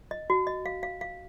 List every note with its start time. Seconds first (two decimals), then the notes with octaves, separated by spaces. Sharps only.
0.11 D#5
0.30 F#4
0.47 D#5
0.66 F5
0.83 F5
1.01 F5